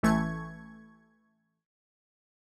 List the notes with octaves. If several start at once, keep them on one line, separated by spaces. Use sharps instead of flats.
A1 E3 A3 C#6 G#6